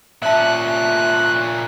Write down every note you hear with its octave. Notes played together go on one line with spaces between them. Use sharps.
A#2 C#4 E5 A5 F#6